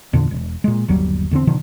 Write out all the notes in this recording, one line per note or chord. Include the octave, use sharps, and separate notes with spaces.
E2 A#2 D3
E1
A#2 G#3
G1 D#2 F#3 G3
E2 D3 E3 C4
B2 D3 D#3 F3